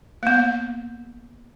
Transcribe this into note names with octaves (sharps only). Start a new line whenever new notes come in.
A#3 B3